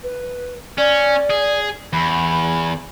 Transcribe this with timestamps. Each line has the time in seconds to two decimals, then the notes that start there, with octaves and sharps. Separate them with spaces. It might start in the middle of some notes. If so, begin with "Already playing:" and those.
0.03 B4
0.78 C#4 D5
1.30 G#4
1.93 E2 B5